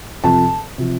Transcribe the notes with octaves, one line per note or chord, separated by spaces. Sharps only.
F2 C3 F3 A5
C3 F3